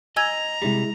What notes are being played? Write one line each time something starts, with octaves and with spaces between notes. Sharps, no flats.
D#5 G#5 A#5 E6 G#6
C3 G3 G#3 E4